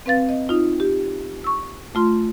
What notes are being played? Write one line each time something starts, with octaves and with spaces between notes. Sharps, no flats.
C4 B4 F5 A6
D#5
D#4 F4
G4
C#6 E6
A3 F4 C6